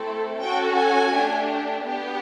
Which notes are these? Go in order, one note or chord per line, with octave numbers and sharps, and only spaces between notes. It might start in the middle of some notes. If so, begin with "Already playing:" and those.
Already playing: A3 C4 E4 A4
C#4 F#4 A4 G5
G#5
A3 D4 G4
B3 D4 G4